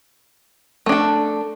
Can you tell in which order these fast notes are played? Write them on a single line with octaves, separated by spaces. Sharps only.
A3 D4 A4